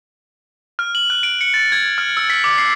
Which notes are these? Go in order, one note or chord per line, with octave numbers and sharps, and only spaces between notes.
F6
F#7
F#6
D7
C#7
A6
G#6
F6
E6
B6
D6
C7